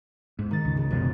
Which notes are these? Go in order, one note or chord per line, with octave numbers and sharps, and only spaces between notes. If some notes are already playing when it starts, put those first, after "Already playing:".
G#2
D#3 A6
C#2
C#3
E1 F#2 B2 D#3 F3